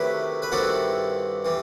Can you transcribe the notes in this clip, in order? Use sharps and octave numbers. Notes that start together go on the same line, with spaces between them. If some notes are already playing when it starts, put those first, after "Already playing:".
Already playing: C3 D#3 F#3 A3 E4 G4 B4
B4
G2 D#3 G3 C4 E4 F#4 A4
E3 G3